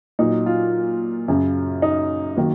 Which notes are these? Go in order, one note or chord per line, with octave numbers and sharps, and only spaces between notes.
A#2 F#3 D#4
F4
F#2 C#3 F#3
D#4
D#3 F#3 A#3